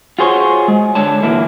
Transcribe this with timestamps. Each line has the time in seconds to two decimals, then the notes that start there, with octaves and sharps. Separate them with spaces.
0.19 F4 F#4 G#4 C5 C#5
0.68 G#3
0.95 D3 C#5 A5
1.23 A#2 E3 F#3 A#3 E4